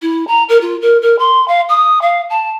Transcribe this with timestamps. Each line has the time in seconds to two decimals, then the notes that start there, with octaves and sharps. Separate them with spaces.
0.02 E4
0.27 A#5
0.49 A#4
0.61 F4
0.82 A#4
1.02 A#4
1.19 C6
1.48 F5
1.69 D#6
2.02 F5
2.30 A5